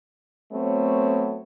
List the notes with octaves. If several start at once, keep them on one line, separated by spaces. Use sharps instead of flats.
F#3 A3 B3 C4 C#5